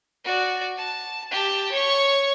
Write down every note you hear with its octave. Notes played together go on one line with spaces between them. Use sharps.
F#4 D5
A5
G4 A5
C#5 C#6